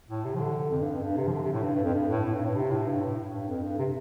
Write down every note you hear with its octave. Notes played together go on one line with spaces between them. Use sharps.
A2
C3
F3
D3
F2
G2
F2
G2
C3
F3
D3
C3
A2
G2
G2
F2
G2
A2
A2
G2
A2
C3
A2
G2
A2
G2
F2
G2
C3